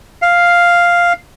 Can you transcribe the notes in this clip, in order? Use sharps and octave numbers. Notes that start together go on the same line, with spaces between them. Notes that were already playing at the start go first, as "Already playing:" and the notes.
F5